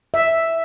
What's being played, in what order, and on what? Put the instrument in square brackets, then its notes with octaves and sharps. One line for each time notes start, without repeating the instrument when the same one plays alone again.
[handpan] E5